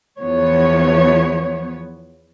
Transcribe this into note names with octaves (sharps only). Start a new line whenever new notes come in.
E2 F3 B3 C#5